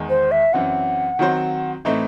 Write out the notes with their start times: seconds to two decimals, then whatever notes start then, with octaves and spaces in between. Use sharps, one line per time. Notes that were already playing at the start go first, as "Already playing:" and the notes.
Already playing: E2 D#3 G#3
0.09 C5
0.31 E5
0.53 F#2 E3 C4 F#5
1.19 D#3 F#3 C4 F#4 C5
1.85 A2 E3 A3 C4 D#4